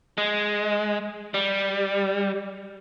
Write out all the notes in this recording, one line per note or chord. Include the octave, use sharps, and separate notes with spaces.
G#3
G3